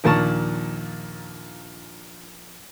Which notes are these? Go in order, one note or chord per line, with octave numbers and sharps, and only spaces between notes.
A#1 D#2 A#2 A5 C#6